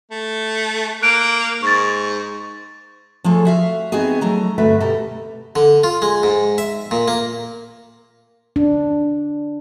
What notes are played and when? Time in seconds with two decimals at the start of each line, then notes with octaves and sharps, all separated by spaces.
0.11 A3
1.02 A#3 F#6 D7
1.62 G#2 C#6 A6
3.24 F3 A3 F4 G#4 A4 C#5
3.45 F#4 E5 F5
3.92 B3 C4 D#4 F#4 G#4
4.21 F#3 A3 A#5
4.58 D2 G2 A3 F#4 B4 E5
4.80 B2 G4 A4 A#5
5.56 D3
5.84 F4
6.02 G#3
6.23 G#2
6.58 E5
6.91 A#2
7.08 A#3
8.56 D4